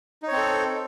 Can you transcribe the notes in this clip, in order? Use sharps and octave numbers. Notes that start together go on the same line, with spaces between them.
C4 D#4 A4 C#5